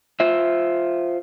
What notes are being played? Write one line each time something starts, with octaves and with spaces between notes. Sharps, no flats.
F4 C5 E5